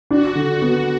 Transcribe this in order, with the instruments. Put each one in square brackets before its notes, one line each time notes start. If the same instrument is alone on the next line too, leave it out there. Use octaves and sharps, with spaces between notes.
[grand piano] D4 [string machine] F#4
[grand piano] D3
B3